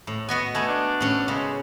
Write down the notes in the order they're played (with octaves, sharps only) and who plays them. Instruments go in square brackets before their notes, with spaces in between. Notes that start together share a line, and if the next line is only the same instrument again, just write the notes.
[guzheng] A2
[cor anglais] B3 [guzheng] F#4 D#5 G#5
[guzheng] A3 B3 [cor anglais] G#5
[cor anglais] D4
[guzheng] A2 C#4
[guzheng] C#3 [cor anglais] G#3